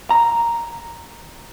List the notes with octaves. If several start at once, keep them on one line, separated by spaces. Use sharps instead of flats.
A#5